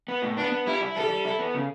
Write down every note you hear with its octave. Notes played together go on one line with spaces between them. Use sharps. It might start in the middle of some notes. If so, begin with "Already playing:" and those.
B3
A2
B3 D4
B3
G3 E4
E4
G3 A4
G3
E4
B3
C#3